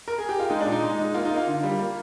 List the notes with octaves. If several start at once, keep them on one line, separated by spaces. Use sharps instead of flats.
A#4
G#4
G4
F4
G#3 D#4
D4
A#2 D#4
G#3
G#3
A#3 F4
D#4
A#3
F4
D3
G3
A#3